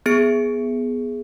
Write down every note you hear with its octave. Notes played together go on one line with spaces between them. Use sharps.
B3 G#4 C#7 D7